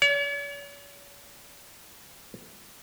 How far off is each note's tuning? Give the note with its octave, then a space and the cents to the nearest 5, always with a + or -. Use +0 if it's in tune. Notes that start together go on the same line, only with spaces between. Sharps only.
C#5 +45